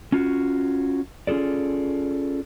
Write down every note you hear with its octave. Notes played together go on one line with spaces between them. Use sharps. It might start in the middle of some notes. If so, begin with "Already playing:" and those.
C#4 F4 F#4
C#4 F4 G#4 A4 D5